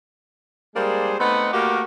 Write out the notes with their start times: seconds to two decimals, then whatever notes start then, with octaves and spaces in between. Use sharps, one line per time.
0.76 G3 G#3 A#3 D4 G#4 C5
1.19 A3 B3 C4 D#4 B4 F#5
1.53 A3 A#3 F#4 G4 A#4